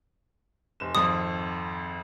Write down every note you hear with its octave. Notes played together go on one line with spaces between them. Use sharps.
F1 E7
G#1 F2 D#6